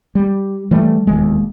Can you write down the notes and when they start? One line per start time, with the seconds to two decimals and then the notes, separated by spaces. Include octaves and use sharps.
0.15 G3
0.71 E3 G3 A3
1.07 E1 D#2 G#3